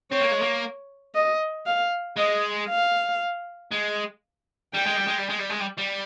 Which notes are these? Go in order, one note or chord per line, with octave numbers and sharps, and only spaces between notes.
C4 C#5
A#3
G#3
A#3
D#5
F5
G#3 D#5
F5
G#3
G3 G5
G#3
G3
G#3
G3
G#3
G3
G#3
G3
G3